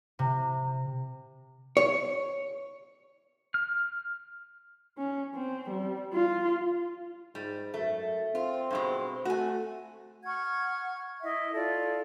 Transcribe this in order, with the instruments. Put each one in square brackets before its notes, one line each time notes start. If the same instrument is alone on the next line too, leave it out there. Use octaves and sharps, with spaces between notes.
[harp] C3
[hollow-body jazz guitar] C#5
[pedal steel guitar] F6
[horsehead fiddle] C#4
C4
G3
F4
[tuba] G#2 [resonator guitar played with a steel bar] G3
[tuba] F#2 [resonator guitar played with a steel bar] A3
[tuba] C4 [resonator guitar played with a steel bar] F4
[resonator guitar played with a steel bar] G2 B2 G#3
[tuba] A3 [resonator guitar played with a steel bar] F#4 G#5
[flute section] F#5 C#6 F6 G#6
E4 D#5 E5
E4 F4 A4 D5